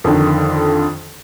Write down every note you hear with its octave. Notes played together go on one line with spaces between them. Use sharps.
F2 D3 D#3